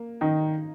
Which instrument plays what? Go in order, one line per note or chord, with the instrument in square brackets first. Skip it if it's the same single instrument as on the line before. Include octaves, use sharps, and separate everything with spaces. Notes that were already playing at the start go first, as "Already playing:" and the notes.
Already playing: [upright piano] A#3
[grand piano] D#3 [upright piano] D#4